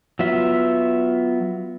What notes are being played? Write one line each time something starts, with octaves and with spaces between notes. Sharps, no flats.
F#3 B3 F4 E5